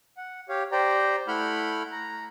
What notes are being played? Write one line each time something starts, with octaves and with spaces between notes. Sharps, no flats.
F#5
G4 C#5 F5
G4 C5 D5 G5 A#5
A3 E4 F#5 B5 F6 G6
A#5